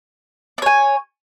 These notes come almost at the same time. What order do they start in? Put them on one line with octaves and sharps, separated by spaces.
D5 C#5 G#5